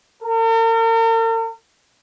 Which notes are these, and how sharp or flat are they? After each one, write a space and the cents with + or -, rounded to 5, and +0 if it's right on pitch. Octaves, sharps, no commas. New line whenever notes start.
A#4 -45